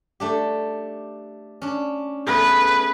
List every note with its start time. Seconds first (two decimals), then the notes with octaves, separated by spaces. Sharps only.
0.20 A3 D4 G4
1.62 C#4 D4
2.27 A3 B3 G#4 B4